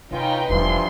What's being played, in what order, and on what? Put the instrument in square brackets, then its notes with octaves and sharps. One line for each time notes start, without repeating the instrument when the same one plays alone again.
[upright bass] C3 [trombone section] C#4 F4 [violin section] D#4 B4 G5
[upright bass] E1 G3 [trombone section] G2 E3 F3 [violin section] C6